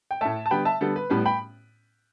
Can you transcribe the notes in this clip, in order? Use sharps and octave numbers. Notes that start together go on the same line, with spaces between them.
G5
A2 A3 E5 A5
A5
D3 G3 B3 G5 B5
E5 A5
D3 G3 B3 A4
B4
A2 G3 B3 B4
G5 B5